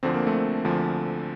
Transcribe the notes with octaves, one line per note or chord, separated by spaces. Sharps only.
D2 D3 F3 C4
A#3
A3 C4
D2 D3 F3